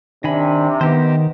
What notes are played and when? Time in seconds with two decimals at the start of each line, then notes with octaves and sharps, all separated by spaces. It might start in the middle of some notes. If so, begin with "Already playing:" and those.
0.24 C3 D#3 D4 G#5 B5
0.81 D#3 B3 D#4 G4 C5